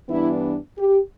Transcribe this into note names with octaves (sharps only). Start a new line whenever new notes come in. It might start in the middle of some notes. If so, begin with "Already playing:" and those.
G2 E3 B3 D4 E4
G4